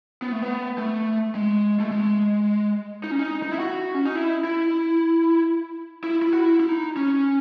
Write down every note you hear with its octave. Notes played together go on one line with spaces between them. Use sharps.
B3
A3
B3
A3
G#3
A3
G#3
D#4
C#4
D#4
D#4
E4
F#4
C#4
D#4
E4
E4
E4
E4
F#4
E4
E4
D#4
C#4